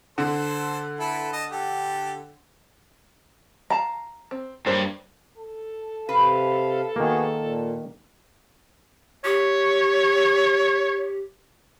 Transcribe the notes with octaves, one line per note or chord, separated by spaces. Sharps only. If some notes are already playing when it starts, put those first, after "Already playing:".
D3 A4 C5
E4 A4 B4
D#5 A5
G4 A4
F5 A5 A#5
C4
G2 F#3 A#3 C5
A4
C3 B4 F5
D#3 A#3 B3 F#4 G#4
A#2
G4 C#5